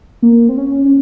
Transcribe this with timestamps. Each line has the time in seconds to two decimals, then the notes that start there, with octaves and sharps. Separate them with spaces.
0.22 A#3
0.49 C4
0.57 C#4
0.85 C#4